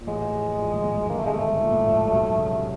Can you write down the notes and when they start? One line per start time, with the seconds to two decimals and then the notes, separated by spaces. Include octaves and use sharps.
0.01 A#2
0.07 A1 A2 G#3
0.32 A#1 A#2
0.59 A#1 A#2
0.71 G#1 G#2
0.84 G#1 G#2
0.96 F#2
1.09 G1 G2 A#3
1.18 A3
1.25 G2 G#3
1.34 G#1 G#2 A3
1.60 A#2
1.72 A2
1.83 A#1 A#2
2.11 B1 B2
2.37 C#3
2.51 C3